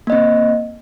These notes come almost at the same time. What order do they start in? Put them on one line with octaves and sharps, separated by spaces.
A#3 D#5 C4